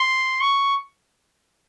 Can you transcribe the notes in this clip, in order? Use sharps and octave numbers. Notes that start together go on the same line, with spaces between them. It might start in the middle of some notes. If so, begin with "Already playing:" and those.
Already playing: C6
C#6